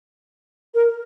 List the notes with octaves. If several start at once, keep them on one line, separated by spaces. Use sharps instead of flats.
A#4